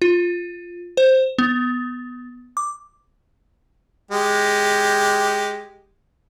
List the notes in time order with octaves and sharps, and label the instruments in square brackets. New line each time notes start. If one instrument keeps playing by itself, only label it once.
[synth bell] F4
C5
B3
D6
[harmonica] G#3 G4